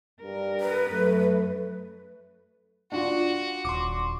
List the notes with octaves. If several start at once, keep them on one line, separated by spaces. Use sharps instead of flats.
G2 A#4
B4
F#2 A3
D4 F4 F#4
D#1 C6 D6